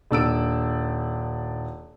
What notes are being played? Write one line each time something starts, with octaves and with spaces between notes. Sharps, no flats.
D#1 D4 E6 D7